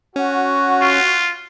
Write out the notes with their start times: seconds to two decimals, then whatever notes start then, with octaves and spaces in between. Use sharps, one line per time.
0.16 C#4 F#4
0.81 F4